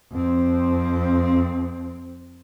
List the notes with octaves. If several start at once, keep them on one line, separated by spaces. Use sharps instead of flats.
F2 C4